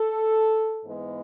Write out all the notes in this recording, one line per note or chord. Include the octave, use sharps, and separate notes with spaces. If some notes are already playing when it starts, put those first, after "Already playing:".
Already playing: A4
G#2 E3 G#3 B3